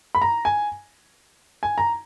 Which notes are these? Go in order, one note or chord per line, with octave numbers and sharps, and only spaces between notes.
B5
A#5
G#5
G#5
A#5